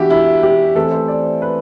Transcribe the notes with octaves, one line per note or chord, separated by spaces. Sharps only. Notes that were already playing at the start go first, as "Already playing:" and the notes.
Already playing: E3 B3 D4 E4 F#4 G4
E4
G4
E3 A3 C4 A4
C5
D5
B4